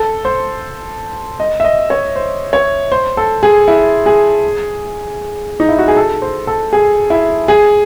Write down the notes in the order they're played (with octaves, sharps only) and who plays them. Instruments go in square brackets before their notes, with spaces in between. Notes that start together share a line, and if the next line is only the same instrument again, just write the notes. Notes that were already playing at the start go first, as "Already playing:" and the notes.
Already playing: [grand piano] A4
C5
D#5
E5
D#5
C#5
C5
C#5
C5
A4
G#4
E4
G#4
D#4
E4
F#4
G#4
A4
C5
A4
G#4
E4
G#4